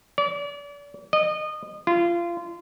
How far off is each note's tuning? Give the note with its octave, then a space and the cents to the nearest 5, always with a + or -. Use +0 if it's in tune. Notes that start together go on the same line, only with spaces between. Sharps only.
D5 -35
D#5 -25
F4 -25